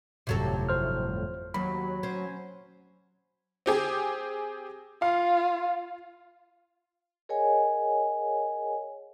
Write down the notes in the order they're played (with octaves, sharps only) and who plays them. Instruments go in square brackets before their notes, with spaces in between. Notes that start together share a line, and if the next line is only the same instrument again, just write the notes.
[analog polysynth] G1 F2 A2 [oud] C3 F#3 A4
[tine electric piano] C5 F6
[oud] D#2 [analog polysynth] F#3 [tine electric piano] B5
[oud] C4 C#4
[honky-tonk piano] C4 G4 G#4
[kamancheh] F4 [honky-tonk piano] F5
[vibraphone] G#4 A#4 C#5 D#5 F#5 G#5